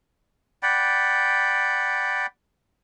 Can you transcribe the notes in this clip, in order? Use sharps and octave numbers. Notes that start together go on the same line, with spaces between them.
D5 F#5 G5 B5